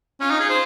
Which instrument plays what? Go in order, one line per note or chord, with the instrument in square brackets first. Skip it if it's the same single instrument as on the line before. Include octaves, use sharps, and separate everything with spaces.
[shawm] C#4 [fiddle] F4
[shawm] D#4
G#4
C5